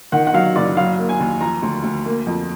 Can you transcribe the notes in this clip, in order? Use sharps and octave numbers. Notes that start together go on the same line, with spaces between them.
D#3 F#5
F#5
F#3 F5
F#1 D5
F#3 F5
A#3
G#5
D#2
F3 A#5
D2
D2
A#3
F2